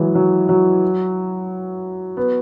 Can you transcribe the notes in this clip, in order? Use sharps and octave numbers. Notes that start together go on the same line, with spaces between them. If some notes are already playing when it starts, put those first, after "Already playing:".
Already playing: E3 F#3 G#3
F#3
F#3
B3